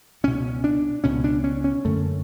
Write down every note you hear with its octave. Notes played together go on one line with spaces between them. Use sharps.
C#2 B2 C#4
D4
C#2 B2 C#4
D4
C#4
C#4
F#2 D3 A3